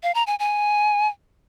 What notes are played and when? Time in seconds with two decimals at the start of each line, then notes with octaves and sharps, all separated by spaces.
0.03 F5
0.15 A#5
0.27 G#5
0.39 G#5